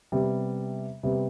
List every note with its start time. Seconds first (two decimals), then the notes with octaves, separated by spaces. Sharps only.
0.12 C3 G3 B3
1.03 C3 G3 B3